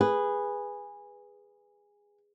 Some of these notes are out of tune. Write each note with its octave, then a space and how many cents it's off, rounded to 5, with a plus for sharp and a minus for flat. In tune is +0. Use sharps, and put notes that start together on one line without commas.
G#4 -15 B4 +0